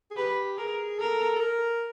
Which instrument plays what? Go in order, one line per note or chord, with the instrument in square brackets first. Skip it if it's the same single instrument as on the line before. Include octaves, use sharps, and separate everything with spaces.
[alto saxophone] G#4
[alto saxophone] G4 [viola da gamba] B4
[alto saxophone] G#4 [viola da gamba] A#4
[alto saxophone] A4 [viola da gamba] A#4
[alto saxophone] A4
A#4